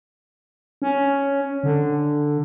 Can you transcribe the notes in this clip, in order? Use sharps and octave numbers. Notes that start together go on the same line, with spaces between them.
C#4
D3